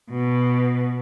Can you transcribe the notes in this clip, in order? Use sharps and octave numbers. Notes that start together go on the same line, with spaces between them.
B2